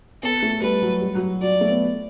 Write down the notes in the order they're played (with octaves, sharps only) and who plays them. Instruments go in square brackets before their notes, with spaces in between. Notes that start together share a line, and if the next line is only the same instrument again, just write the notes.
[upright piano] B3 [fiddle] A4
[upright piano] A3
[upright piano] G3 [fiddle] B4
[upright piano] F#3
G3
F#3
[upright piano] F#3 [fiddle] D5
[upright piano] A3
B3